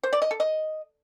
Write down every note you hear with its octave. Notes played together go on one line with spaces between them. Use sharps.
C5
D5
D#5
A4
D#5